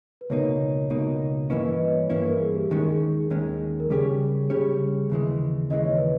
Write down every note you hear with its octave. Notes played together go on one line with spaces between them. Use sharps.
B4
C#2 B2 A#3 D#4 C#5
C#2 B2 A#3 D#4
G2 E3 A#3 C#4 E4 B4 D#5
B4 D#5
C#5
G2 E3 A#3 C#4 E4 B4
A#4
G#4
G4
D#2 D#3 G#3 C#4 G#4
A#4
G#4
D#2 D#3 G#3 C#4
A#4
C#3 G3 C#4 G4 G#4 C#5
C#3 G3 C#4 G4 G#4 C#5
D#2 C#3 E3 G#3
D#2 C#3 E3 G#3 D#5
C#5
B4